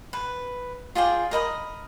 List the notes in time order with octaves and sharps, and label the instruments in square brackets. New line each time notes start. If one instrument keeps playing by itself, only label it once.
[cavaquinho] B4
F4 G#4 D5 G5
A#4 D#5 B5 D#6